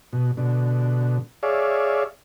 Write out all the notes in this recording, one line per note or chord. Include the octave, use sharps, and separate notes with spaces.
B2
B2 D3
G#4 C#5 D5 E5 F5